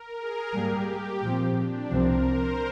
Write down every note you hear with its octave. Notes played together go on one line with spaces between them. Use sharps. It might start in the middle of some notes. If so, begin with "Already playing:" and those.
Already playing: A#4
G#4
G#2 G3 A#3 G4
A#2 F3 C4 F4
D4
C2 C3 F3 C4 A#4
C5